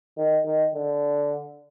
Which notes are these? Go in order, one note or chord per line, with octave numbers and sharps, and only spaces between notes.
D#3
D#3
D3